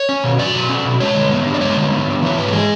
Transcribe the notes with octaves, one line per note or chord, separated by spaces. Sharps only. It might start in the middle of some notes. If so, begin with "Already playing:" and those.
Already playing: C#5
C#4
B2
F#3 D5
B2
C#4
B2
G#3 C#5
D3
B3
D4
D5
G#3 C#5
D3
B3
D4
E3 C#5
G#2 B4
A4
G#3 G#4